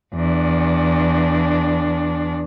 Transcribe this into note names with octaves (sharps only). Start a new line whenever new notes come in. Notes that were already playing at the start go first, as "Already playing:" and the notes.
E2 D4